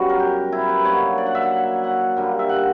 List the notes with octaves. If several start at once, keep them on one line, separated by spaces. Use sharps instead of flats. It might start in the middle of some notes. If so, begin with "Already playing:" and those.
Already playing: F#2 C#3 G3 B3 F#4
A#4
G4
E4
B4
D3 F#3 A#3 C#5
D5
F#5
E5
F#5
F#5
D3 G3 A#3
E5
F#5